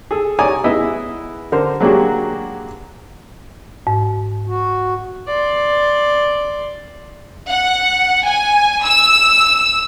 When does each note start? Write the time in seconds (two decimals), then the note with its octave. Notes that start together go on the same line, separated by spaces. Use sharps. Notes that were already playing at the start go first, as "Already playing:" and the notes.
0.11 G#4 A4
0.39 C#5 D5 G#5 A#5 D#6
0.64 B3 E4 G#4 D#5 E5
1.52 D3 A#4 C5
1.80 F#3 G#3 A#3 D4 F#4 G4
3.87 G#2
4.48 F#4
5.27 D5 C6
7.50 F#5
8.26 G#5
8.85 E6